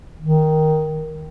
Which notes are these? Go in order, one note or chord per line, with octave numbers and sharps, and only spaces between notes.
D#3